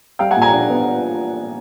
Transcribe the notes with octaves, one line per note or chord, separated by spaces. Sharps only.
G3 F5 G5
F#5 G#5
A#2
G#5 A#5
D4
B3